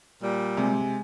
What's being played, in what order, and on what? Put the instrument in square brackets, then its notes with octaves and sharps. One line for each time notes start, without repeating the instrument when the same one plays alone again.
[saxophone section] A#2 G3
[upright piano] C3 [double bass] G#3